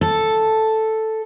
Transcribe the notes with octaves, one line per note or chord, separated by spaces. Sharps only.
A4